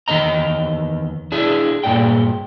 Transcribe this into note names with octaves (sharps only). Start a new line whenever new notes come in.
E2 D#3 A#3 A#4 D#5 A#5
D4 E4 G#4
G2 A#2 G#4 D5 G5